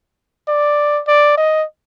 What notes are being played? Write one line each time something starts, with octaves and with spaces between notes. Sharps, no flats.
D5
D5
D#5